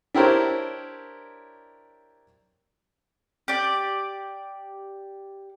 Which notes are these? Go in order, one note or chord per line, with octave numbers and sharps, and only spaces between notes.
D4 E4 G4 A#4 C5 C#5
G4 D5